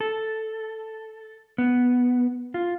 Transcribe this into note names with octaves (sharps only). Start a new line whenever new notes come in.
A4
B3
F4